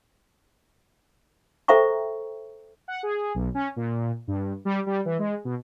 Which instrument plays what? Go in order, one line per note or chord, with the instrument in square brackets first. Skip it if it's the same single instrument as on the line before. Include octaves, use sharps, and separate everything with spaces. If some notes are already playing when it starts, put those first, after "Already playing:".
[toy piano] A4 C5 E5 G5 A#5 C#6
[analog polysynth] F#5
G#4
B1
C#4
A#2
G2
G3
G3
E3
G#3
B2